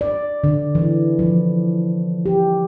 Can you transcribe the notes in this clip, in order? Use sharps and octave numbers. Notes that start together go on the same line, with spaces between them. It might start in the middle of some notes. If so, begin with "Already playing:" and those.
D5
D3
E3
F3
G4